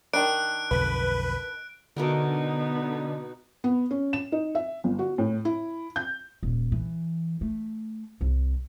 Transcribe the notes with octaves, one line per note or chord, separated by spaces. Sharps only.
D#3 D4 F#6 D7
B1 F2 D3 B4
B2 D3 A3 B3 D#4 A#4
B3
C#4
E7
D#4
E5
G1
F#4
A2
E4
G6
D#1
E3
A3
C2